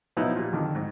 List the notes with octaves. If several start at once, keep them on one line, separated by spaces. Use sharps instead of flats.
B2 F3 F#3 B3 D#4 E4
A#2 G3
F2 D3 D#3
G#2